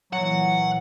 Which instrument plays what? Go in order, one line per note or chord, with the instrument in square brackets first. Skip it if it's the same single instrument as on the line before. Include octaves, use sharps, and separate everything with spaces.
[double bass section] A#2 E3 [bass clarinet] F#3 [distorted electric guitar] F#5